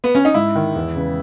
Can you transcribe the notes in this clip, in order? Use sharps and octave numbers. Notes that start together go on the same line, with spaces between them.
B3
C#4
D#4
G#2 E4
D#3
E2
C#3 E3